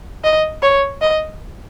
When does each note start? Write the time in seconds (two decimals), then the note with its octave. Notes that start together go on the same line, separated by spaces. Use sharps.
0.24 D#5
0.62 C#5
1.01 D#5